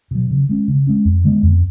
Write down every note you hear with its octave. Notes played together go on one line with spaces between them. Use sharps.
B2 F#3
C#3
G#3 C#4
C#3
G#3 C#4
F2
D3 G#3 B3
F2